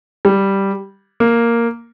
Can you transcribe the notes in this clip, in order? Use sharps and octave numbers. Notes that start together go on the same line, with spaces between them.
G3
A#3